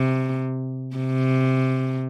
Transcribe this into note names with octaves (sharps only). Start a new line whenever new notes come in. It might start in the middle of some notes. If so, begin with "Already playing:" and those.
Already playing: C3
C3